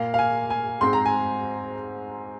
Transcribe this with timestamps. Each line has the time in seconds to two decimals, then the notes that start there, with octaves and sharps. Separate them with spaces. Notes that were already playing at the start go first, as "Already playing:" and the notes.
Already playing: A#2 A#3 F5
0.14 F5
0.19 G#5
0.50 G#5
0.81 G#2 G#3 C4 C6
0.93 A#5
1.06 G#5